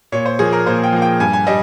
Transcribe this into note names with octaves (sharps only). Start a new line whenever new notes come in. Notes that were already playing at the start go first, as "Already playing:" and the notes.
A#2 C#5
C5
F3 A#3 G#4
A#4
A#2 C5
G5
F3 A#3
G5
G2 G#5
G#5
G3 D#5